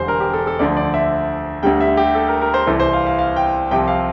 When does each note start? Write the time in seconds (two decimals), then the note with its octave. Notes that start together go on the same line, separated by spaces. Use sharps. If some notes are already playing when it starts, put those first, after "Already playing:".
Already playing: E1 E2 D3 G3 C5
0.08 A#4
0.20 G4
0.33 A4
0.47 A4
0.59 D2 D3 F3 D5
0.77 D5
0.94 E5
1.63 D2 D3 G3 G5
1.81 E5
1.97 G4
2.15 A4
2.28 A#4
2.41 A#4
2.54 C5
2.67 C2 C3 E3 A4
2.80 C5
2.93 F5
3.06 F5
3.19 F5
3.36 G5
3.71 C2 C3 F3 G5
3.88 F5